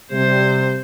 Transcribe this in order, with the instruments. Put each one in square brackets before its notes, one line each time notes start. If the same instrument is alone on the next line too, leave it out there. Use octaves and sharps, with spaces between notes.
[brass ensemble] C3 G3 [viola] C5